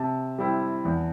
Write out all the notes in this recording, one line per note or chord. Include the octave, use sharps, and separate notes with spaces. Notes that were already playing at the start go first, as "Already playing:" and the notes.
Already playing: C3 A5
G3 C4 E4
E2